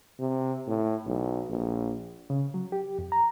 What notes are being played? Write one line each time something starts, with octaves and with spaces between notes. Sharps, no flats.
C3
A2
B1
A#1
C#3
F#3
G4
F2
A#5